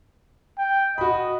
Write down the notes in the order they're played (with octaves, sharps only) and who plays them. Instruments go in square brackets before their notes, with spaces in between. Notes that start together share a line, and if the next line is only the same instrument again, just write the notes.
[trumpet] G5
[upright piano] F#4 B5 [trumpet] D#5